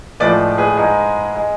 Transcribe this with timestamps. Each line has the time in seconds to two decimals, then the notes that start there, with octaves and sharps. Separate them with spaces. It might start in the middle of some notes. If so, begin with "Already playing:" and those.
0.20 A2 F3 G#3 B4 D5
0.58 G#4 B4
0.77 G#2 G#3
1.35 G#3